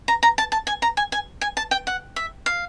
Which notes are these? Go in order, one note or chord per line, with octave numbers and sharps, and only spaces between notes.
A#5
A#5
A5
A5
G#5
A#5
G#5
G#5
G#5
A5
G5
F#5
E5
F5